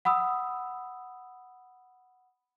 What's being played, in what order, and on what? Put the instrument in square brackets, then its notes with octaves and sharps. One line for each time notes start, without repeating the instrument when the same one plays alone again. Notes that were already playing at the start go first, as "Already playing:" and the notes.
[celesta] F#5 B5 D#6 E6